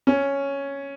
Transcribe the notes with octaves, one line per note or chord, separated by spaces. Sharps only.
C#4